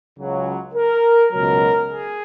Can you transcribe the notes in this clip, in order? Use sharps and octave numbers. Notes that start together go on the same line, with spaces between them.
C#2 C#3 F#3
A#4
C#2 B2 F#3 A#4
G#4